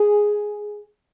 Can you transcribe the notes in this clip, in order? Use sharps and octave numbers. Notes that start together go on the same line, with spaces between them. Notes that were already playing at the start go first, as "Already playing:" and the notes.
Already playing: G#4